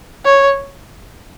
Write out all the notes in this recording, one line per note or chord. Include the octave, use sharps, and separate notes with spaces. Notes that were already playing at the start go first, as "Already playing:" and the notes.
C#5